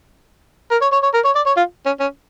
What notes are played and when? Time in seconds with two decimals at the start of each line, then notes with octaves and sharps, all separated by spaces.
0.71 A#4
0.82 C#5
0.92 C#5
1.03 C#5
1.14 A#4
1.25 C#5
1.35 D5
1.46 C#5
1.57 F4
1.86 C#4
2.00 C#4